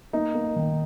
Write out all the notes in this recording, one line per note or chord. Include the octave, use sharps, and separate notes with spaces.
A#3 D#4
A#3
D#3